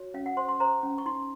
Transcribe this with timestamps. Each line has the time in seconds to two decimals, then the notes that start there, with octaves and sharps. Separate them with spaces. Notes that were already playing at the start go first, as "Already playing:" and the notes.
Already playing: F#4 C#5
0.14 C#4 F5
0.26 F#5
0.37 C5 C6
0.48 C6
0.60 C5 A#5
0.83 C#4
0.98 C#6
1.06 D#4 C6